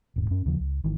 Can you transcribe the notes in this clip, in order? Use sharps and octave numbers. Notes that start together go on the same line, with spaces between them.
D#1 G#2
F#2 C#4
D#2 C#3 F3
C#2
G#1 D#3 E3